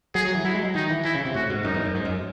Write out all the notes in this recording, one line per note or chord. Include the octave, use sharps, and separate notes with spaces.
F#3 G#4
F#3
E3
F#3 E4
G#3
F#3
D#3 D#4
E3
E3 E4
C#3
C3
A2 F#4
G#2
F#2 D#4
E2
F#2
G#2
F#2